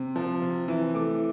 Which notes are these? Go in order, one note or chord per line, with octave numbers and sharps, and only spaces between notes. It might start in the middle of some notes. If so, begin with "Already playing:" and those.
Already playing: C3
F3
C3
E3
A3 D6